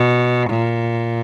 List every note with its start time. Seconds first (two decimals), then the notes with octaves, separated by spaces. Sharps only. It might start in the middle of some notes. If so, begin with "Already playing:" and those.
Already playing: B2
0.50 A#2